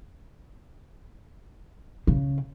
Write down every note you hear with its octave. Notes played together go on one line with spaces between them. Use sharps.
C#3